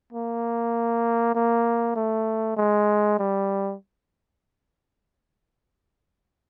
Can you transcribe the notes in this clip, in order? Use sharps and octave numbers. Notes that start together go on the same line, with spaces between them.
A#3
A#3
A3
G#3
G3